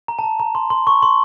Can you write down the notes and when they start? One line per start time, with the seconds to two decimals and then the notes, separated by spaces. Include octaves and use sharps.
0.08 A#5
0.19 A5
0.24 A#5
0.40 A#5
0.55 C6
0.70 C6
0.87 C#6
1.03 C6